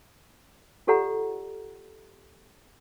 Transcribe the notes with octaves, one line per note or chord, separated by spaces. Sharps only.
F4 G4 A4 D5 F#5 A#5